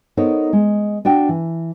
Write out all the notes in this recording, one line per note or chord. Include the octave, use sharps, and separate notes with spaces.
B3 D#4 A4 A#4 C5 C#5
G#3
D4 F#4 G5
E3